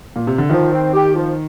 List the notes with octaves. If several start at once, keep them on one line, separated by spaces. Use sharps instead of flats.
A#2
C3
D3
D#3 F3
C4
G4
F3